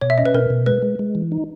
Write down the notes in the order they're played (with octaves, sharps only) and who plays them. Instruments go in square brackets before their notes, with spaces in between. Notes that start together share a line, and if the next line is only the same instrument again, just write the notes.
[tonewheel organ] B2 [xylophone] C#5
[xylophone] E5
[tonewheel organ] C#4 [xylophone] D#5
[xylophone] B4
[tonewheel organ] B2 [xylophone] A#4
[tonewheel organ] B2
[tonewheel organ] G#3 [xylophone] B4
[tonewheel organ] G#3
G#3
E3
D#4